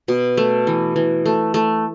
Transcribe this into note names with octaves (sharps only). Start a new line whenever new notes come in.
B2
A3
E3
E3
A3
A3